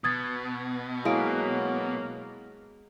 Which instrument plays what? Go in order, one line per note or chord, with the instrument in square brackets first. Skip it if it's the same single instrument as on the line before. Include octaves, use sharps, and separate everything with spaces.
[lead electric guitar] B2 [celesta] D#6 G#6 A6
[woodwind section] F#3 A#3 [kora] G#3 [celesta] E4 F5 D7